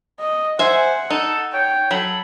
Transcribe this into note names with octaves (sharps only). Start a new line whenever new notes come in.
D#5
C5 E5 F#5 G#5
D#4 A4
C#5 G5
F#3 A4 B5